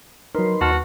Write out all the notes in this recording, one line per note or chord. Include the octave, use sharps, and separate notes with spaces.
F#3 D#4 A#4 B4 C6
D#2 F#4 A5 F6